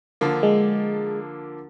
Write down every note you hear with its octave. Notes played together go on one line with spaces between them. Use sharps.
D3 F3 A#3
G#3